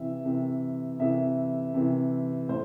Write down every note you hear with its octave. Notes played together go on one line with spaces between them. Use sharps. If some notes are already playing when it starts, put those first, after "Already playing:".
Already playing: C3 E3 E5
C3 E3
C3 E3 E5
C3 E3
A2 C5